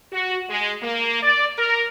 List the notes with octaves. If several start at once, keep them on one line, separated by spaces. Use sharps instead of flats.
F#4
G#3
A#3
D5
A#4